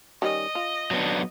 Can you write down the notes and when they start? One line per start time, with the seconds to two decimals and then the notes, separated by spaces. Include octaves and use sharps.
0.22 D#3 G3 C#4 D#5
0.55 F4
0.91 F#3 B3 D4